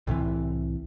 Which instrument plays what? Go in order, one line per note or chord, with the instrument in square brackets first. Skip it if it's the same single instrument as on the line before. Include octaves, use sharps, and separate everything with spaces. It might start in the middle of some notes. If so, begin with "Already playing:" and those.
[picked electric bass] C2 A2 C3 E3